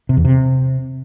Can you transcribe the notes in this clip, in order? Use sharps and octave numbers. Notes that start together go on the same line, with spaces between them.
C3
E2
C3